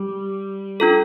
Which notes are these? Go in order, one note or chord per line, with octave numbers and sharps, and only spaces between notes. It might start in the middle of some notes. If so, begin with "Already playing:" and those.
Already playing: G3
D4 F4 A4